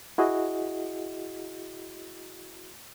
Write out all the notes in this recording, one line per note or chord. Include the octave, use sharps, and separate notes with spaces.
E4 F#4 G#4 D#5